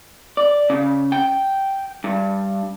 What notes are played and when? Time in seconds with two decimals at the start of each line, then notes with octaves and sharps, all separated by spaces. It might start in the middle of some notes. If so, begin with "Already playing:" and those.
0.37 D5
0.70 C#3
1.12 G5
2.04 G2